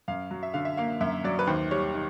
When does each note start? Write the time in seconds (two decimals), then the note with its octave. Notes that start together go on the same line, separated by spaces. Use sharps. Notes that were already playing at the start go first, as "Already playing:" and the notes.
0.08 F#2 F5
0.31 F#3
0.43 E5
0.54 D3 F5
0.65 E5
0.77 A#3 F5
1.01 F#2 E5
1.24 F#3 D5
1.39 B4
1.47 D#2 C5
1.71 G3 C#5
1.94 D#3